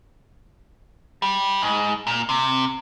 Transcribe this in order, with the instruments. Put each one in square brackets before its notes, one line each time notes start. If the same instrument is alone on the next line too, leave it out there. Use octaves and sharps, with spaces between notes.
[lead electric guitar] G3
G#2
A#2
C3